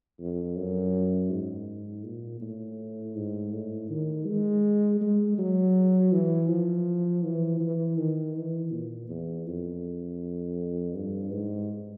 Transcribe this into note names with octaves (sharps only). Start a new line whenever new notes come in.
F2
F#2
G#2
A#2
A2
G#2
A2
D#3
G#3
G#3
F#3
E3
F3
E3
E3
D#3
E3
A#2
E2
F2
G2
G#2